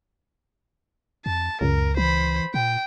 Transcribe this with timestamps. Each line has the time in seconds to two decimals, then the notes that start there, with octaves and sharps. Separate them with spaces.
1.26 F2 A5
1.61 C#2 F#2 A#4
1.97 E3 C5 B5
2.54 A#2 G5